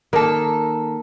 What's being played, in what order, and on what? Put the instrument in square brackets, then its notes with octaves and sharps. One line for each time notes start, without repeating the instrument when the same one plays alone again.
[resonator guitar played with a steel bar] D#3 A4 [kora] A#3